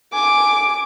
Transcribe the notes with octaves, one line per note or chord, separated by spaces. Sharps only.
G#5 D6